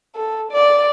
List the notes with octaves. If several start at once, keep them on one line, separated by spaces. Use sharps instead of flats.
A4
D5